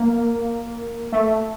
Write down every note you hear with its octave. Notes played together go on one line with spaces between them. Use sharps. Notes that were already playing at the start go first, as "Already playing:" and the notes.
Already playing: A#3
A3